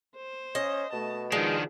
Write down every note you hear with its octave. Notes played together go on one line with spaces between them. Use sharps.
C5
C#4 D#5
B2 A3 A5
D#3 F3 G#3 D4 G#4